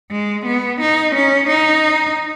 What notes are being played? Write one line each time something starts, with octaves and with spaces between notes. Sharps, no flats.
G#3
B3
D#4
C#4
D#4